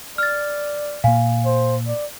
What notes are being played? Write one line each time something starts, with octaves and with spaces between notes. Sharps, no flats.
D5 F6 A6
A#2 A#3 F5 G#5
C5
D5